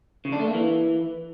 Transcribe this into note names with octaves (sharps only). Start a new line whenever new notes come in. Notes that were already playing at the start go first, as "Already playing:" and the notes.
C#3
D4
A3
A#3
E3